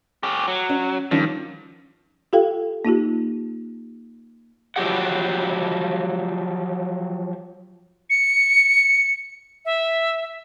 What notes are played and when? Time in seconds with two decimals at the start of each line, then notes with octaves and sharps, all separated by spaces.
0.23 C#4 G4
0.48 F#3
0.69 C#4
1.11 G2 D#3 F3 C#4
2.33 F4 G4 A4 F5 G5
2.85 A#3 D#4 F4 G4
4.76 F3 F#3 F#4 G4 F#5
8.10 C#7
9.65 E5